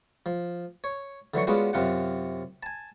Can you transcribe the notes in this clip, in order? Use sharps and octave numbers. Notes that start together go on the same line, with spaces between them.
F3
C#5
D3 E3 F#3 C#6
G#3 B3 C#4 D4 F4 F#4
F#2 C3 F4 F#5
G#5 A5